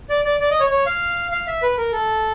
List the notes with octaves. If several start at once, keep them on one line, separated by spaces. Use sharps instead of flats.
D5
D5
D5
D#5
C#5
C#5
F5
F5
E5
B4
A#4
A4